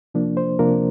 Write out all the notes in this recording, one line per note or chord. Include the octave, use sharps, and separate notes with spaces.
C3 F3 A#3 D4
C5
C3 F3 A#3 D4 A#4